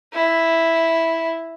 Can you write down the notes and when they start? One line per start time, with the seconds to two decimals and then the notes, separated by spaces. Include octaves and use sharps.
0.14 E4